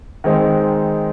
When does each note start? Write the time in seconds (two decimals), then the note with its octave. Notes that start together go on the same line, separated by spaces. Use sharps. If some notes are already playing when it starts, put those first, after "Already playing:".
0.24 D#3 G#3 C4 D#4